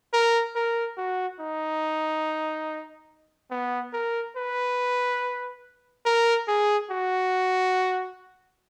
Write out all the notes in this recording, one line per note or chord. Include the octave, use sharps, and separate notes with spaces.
A#4
A#4
F#4
D#4
B3
A#4
B4
A#4
G#4
F#4